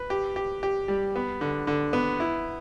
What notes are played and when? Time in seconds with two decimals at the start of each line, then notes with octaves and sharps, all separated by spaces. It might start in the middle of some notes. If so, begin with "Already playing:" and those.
Already playing: B4
0.10 G4
0.36 G4
0.63 G4
0.88 G3
1.16 B3
1.41 D3
1.67 D3
1.93 B3
2.20 E4